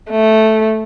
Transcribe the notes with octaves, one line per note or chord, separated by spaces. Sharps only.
A3